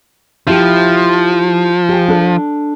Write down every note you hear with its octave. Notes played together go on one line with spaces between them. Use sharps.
F3 E4 G4
G4 G#5
D4 A4